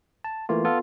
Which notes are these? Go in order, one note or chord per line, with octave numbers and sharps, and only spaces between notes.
A5
E3 A3 A#3 F4
B3 F4 A4